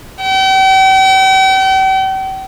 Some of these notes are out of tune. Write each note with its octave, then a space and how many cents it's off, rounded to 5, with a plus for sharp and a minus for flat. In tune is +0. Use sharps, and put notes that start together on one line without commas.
G5 -40